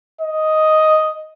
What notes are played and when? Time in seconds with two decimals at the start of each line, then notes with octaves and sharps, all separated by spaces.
0.21 D#5